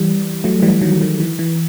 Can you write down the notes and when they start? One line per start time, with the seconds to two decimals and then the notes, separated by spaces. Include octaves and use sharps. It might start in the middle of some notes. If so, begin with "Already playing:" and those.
Already playing: E3 G3
0.44 F#3 A3
0.62 E3 G3
0.81 D#3 F#3
1.01 D#3 F#3
1.20 E3
1.39 E3